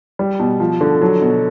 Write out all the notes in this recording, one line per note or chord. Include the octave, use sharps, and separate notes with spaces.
G3
B2
F3
D3
F#3
B2